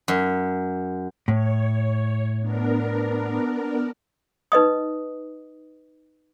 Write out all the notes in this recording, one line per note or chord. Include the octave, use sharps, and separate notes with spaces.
F#2
A2 C#5
B3 D4 A#4
D#4 B4 D#5 D#6